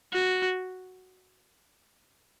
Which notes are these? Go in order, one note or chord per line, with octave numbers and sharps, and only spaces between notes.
F#4